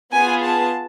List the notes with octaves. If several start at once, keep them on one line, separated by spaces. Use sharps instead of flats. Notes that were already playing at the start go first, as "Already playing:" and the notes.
B3 F4 G#4 G#5
A5